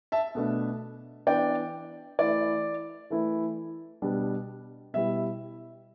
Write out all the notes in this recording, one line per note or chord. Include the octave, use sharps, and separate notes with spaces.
E5 A5
B2 A3 D4
E3 B3 D4 D5 G5
E3 A3 E4 D5
E3 A3 E4
B2 G3 D4
B2 G3 E4 E5